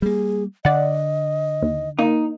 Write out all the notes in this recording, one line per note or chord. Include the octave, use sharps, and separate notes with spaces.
G3 A#3 G#4
D3 D5 D#5 F#5
D#2
A#3 D#4